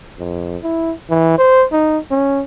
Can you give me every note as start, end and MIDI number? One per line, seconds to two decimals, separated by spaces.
0.19 0.57 41
0.63 0.92 64
1.10 1.35 52
1.38 1.65 72
1.72 1.98 63
2.11 2.43 61